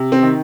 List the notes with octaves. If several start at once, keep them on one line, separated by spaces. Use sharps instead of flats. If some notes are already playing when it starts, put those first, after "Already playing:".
Already playing: C3
C4
D#3